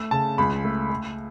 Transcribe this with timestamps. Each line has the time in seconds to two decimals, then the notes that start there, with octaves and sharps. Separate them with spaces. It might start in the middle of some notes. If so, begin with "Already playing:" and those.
Already playing: A3
0.11 C#3 A5
0.38 C#2 B5
0.64 A3
0.90 A3